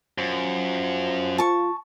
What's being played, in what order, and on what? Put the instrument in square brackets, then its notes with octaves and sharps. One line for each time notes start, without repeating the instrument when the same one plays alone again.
[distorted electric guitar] F#2 [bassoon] F3
[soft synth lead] F4 [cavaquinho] A5 C#6